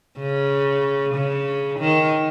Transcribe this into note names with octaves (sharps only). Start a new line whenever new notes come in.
C#3
C#3
D#3